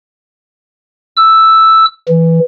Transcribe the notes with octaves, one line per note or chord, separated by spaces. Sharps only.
E6
E3